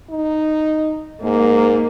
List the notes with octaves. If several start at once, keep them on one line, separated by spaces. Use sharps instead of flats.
D#4
G#2 A#3